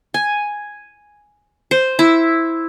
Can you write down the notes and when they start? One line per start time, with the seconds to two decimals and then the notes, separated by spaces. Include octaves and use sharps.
0.14 G#5
1.71 C5
1.99 E4